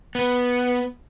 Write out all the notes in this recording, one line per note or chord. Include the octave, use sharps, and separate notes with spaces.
B3